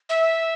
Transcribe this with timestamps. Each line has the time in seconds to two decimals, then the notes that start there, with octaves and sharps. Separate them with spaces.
0.09 E5